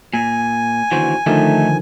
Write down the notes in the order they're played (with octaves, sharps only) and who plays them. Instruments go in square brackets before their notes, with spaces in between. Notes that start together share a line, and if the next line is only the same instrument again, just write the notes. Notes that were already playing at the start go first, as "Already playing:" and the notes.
[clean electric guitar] A#2 [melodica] G#5
[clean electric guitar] D#2 D3 E3 [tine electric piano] F#4 C5
[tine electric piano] D3 D#3 F3 [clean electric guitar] A3 D#4 A4